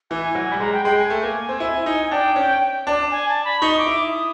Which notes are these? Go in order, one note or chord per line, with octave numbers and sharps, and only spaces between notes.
E3 G#5
F#3
G3
G#3 A#5
G5
G#3 G5
G#5
A3
A#3
C4
E4
D#4
D4 G5
C#4
D4
G#5
A5
B5
D#4 C#6
D#6
D6
E4
D#6